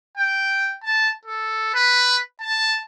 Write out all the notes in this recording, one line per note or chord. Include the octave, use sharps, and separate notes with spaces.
G5
A5
A4
B4
A5